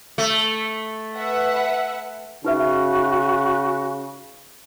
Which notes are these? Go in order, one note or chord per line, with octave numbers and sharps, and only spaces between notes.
A3
B4 E5 F#5
C#3 D#4 F#4 B4 E5